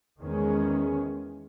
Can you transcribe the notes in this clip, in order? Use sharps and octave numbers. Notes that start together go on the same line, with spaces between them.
E2 D#3 G#3 C#4